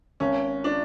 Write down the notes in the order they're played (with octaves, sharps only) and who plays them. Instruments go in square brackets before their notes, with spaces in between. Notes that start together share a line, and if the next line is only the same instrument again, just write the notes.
[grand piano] G#1 [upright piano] C#4
[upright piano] D4